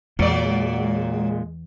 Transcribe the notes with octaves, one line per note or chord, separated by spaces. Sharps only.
E2 A#2 F#3 G#3 D5